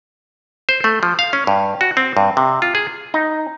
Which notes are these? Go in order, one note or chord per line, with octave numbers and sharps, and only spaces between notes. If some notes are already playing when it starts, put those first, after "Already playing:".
C5
A3
F3
F5
C#4
G2
F#4
C4
G2
C3
F4
G#4
D#4